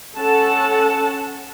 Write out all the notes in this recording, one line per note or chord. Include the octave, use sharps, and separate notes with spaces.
C#4 A4 F#5 A5